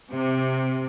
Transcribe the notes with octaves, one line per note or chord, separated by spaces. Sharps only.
C3